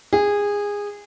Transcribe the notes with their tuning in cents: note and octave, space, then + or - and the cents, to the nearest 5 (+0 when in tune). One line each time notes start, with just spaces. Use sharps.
G#4 -20